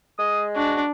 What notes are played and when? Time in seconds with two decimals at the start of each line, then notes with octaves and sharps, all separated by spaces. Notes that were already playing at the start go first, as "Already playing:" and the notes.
0.19 G#3 D#6
0.56 D4 F#4